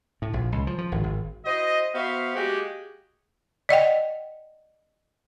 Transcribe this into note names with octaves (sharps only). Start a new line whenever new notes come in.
A2
A#1
C#2
F3
F3
G#1
G#1
E4 F#4 C5 D#5
B3 F#4 C5 E5 F5
G#3 A#3 F#4 G4
D5 D#5 F#5 G5